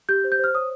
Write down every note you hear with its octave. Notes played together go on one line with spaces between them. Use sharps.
G4 G6
C5
G6
C5 F6
C#5 D#6